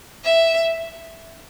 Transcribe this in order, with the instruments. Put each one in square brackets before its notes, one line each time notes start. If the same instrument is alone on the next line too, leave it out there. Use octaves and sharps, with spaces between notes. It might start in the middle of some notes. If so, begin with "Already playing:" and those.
[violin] E5